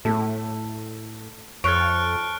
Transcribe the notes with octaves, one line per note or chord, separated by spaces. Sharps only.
A2 A3
F2 A4 C#5 F6 F#6 D7